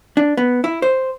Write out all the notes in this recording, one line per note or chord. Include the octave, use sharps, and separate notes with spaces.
D4
B3
E4
C5